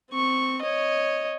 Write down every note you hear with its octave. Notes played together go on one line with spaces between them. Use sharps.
C4 C#6
C#5 D#5